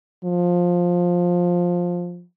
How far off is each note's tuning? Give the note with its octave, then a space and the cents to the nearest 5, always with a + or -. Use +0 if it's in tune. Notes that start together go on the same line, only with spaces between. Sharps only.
F3 +10